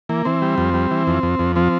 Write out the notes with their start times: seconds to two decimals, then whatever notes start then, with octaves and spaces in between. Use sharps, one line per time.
0.09 E3 A#3
0.25 E3 C4
0.42 G3
0.58 F2
0.74 G3
0.91 E3
1.07 F2
1.23 F2
1.39 F2
1.56 F3 C4